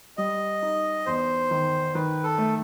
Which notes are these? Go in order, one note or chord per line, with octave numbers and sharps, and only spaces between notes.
G3 D#5
D#4
E2 C5
D#3
D#3 B4
A4
A3